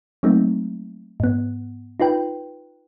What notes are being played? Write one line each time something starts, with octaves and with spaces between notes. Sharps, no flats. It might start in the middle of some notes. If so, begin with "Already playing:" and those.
F#3 G3 A3 A#3 C4 D#4
G#2 B3
D#4 F4 B4 G5